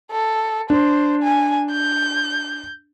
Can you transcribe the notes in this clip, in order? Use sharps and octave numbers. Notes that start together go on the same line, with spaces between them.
A4
D4 C5
G#5
G6